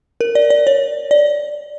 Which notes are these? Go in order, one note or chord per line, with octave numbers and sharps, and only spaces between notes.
A#4
D5
D5
C#5
D5